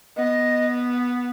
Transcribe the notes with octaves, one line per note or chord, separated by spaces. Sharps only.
B3 D#5